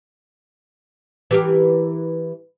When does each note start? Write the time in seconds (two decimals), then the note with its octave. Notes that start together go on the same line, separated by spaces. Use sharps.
1.31 E3 G4 A#4